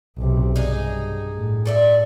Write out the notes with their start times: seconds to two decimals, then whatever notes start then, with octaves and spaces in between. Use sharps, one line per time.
0.17 B1 C3
0.56 G2 D#4 G#4
1.35 A2
1.66 A4 D5 E5